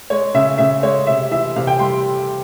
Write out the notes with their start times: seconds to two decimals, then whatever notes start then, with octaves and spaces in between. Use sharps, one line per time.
0.10 G#3 C#5
0.34 C#3 E5
0.58 C#3 E5
0.83 G#3 C#5
1.07 C3 E5
1.31 E3 E5
1.56 C3 F5
1.67 G5
1.79 G3 C6